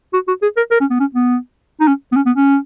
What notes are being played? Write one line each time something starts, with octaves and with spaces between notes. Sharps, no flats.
F#4
F#4
G#4
A#4
A#4
C#4
B3
C#4
B3
D#4
C#4
B3
C#4
B3
C#4